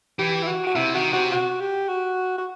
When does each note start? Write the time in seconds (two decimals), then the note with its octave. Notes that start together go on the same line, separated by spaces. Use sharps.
0.19 E3 G4
0.43 E4
0.48 F#4
0.67 F#4
0.76 C3 E4
0.95 D#3 F#4
1.13 C3 F#4
1.32 F#4
1.60 G4
1.89 F#4
2.38 F#4